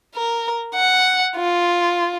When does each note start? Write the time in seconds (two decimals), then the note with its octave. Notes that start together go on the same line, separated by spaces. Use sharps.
0.15 A#4
0.75 F#5
1.37 F4